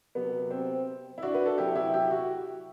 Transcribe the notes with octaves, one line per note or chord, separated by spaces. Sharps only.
C3 F#3 B3
C4
E4
D4 F#4
B4
A4
C3 F#3 E4 G4
E4 G4
E4 G4
F#4